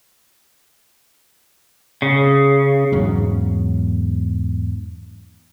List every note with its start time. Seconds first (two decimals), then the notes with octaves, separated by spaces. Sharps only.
2.02 C#3
2.92 E2 G#2 F#3 C#4